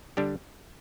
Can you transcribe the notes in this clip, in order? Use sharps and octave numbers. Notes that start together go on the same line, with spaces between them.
D3 G3 D4 G4